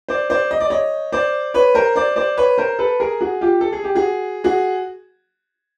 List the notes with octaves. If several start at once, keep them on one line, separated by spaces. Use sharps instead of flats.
C5 D5
C5 D5
D#5
D5
C#5 D#5
C5 D5
B4 C#5
A#4 C5
C5 D5
C5 D5
B4 C#5
A#4 C5
A4 B4
G#4 A#4
F#4 G#4
F4 G4
A4
G#4
G4
F#4 G#4
F#4 G#4